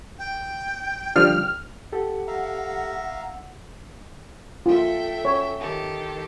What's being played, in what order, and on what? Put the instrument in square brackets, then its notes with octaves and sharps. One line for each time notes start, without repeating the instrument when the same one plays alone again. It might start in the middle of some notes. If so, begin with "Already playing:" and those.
[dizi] G5
[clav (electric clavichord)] D3 F3 G3 [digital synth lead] F6
[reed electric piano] G4 A4 [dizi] F#5
[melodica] E5 F5 A#5
[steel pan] F4 [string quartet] A4 E5 G5
[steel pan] C#5
[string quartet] D#3 G4 A4